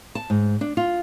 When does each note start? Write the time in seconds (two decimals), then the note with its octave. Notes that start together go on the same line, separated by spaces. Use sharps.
0.15 A5
0.30 G#2
0.61 D4
0.77 F4